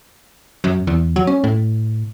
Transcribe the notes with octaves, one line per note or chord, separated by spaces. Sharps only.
F#2
E2
F#3
C#4
A2